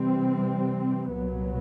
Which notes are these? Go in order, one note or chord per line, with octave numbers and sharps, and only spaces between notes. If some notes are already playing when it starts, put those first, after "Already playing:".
Already playing: C3 E3 G3 C4
C2 A#2 F#3 B3